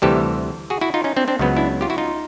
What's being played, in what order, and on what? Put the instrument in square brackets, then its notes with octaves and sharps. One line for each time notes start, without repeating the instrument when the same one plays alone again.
[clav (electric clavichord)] D2 C3 E3 G3 G4 A4
F#4 G#4
E4 F#4
D#4 F4
C#4 D#4
C4 D4
C4 D4
C#2 C#3 F#3 B3
D4 E4
F4 G4
E4 F#4
D#4 F4